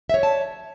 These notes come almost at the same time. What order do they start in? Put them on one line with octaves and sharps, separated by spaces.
E5 C#5 D5 A5